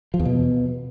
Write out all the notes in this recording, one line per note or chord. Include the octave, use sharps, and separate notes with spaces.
F3
E2
B2